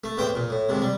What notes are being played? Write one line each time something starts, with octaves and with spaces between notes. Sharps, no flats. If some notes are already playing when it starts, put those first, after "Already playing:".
A3
E2 A2 C5 G5
A#2
A2
D#2 G#2 C3
G3